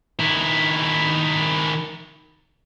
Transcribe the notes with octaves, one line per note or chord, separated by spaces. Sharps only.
D#3 E4